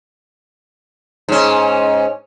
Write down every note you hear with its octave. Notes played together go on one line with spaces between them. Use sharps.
G#2 C#4